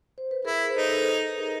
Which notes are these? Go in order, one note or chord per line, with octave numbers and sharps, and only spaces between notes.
C5
B4
E4 G#4 A#4
C5
D#4 A4 B4
A4 B4
D#4 G#4 A#4